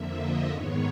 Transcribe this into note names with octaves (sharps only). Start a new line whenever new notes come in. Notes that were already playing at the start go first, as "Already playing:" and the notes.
Already playing: F2 D3 F3 A#3 E5
D#5
G#2 D#3 G#3 B3 C#5